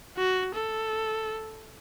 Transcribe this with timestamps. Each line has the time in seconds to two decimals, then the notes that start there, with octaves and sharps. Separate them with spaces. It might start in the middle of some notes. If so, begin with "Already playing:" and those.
0.17 F#4
0.55 A4